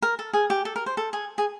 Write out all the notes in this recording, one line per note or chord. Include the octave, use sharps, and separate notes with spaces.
A#4
A4
G#4
G4
A4
A#4
C5
A4
G#4
G#4